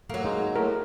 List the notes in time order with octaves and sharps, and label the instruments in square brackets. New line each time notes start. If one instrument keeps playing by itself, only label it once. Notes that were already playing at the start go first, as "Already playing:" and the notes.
[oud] F#3 A#3 [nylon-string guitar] A3
[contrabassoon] G#2 [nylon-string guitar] D#4 G#4
[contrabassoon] A2 [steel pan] A#4